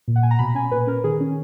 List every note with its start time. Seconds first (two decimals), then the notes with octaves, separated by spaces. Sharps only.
0.08 A#2
0.16 F#5
0.23 A#2 G#5
0.31 A#5
0.39 B2 B5
0.55 C#4 G#5
0.71 A#2 B4
0.87 C#4 A#4
1.04 D#3 G#4
1.20 C#4